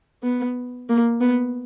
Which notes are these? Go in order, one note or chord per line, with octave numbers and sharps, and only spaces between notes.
B3
A#3
B3